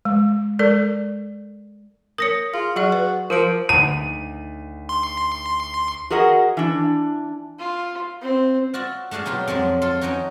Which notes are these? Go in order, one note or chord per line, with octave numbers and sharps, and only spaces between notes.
G#3
G#3 A4 A#4 D5
A#4 C#5 D#6 A#6 C#7
F4 G#4
F#3 F#4 G#4 D5
B4
F3 F4 A#4 D7
D2 D#4 F#5 D#7
C6
F#4 G#4 A#4 D#5 F#5
E3 D4
F4
C4
F4 F#4 D5 E5
A3 D4 F#4 G#4 F5
B2 F#3 D#4 F4 G4
F2 F3 F#3 G#3
F4 A4 C6
C#4 D#4 F#4 C#5 D#5 G5